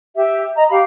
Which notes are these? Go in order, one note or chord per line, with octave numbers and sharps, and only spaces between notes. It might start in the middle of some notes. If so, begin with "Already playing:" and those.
G4 E5
D#5 A#5
G4 F5 B5